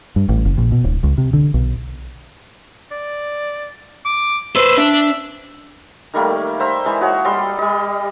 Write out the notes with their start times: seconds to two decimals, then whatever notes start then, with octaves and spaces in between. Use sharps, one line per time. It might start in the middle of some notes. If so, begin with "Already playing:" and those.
0.16 G2
0.29 A1
0.45 F#1
0.58 A#1
0.72 B2
0.84 D1
1.03 C#2
1.18 C3
1.33 D3
1.54 B1
2.91 D5
4.05 D6
4.56 B4 C5 E6
4.78 D4 E5
6.14 D#3 G3 A3 A#3
6.60 C5 E5 A#5
6.85 E3 G#3
7.01 F#4 G#4 C#5
7.25 G3 A4 D#5 C6
7.59 G3 D#5